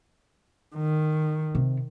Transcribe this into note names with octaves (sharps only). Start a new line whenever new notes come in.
D#3
C3